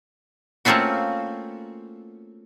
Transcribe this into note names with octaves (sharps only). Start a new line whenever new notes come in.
A3 A#3 C4 C#4 F4 F#4